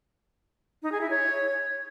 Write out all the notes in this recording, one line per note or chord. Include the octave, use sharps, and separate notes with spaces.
D#4
G#4
E4
C#5